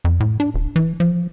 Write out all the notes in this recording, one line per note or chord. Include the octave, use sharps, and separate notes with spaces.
F2
A2
D4
D#1
E3
F3